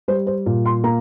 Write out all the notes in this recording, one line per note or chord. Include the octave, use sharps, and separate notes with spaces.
G3 C5
C5
A#2
C6
A#3 A#5